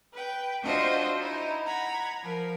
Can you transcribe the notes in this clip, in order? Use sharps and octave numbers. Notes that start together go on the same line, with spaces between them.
B4 G5
D4 F4 F#4 C5 D#5 E5
D#4 E4
F#5 A#5 B5 G#6
F3 A#4